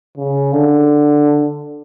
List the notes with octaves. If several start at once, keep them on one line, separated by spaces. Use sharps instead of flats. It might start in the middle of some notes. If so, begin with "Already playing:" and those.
C#3
D3